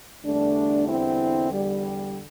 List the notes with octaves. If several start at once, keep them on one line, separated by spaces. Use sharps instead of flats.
E2 D3 G3 A3 D4
C4 E4
G3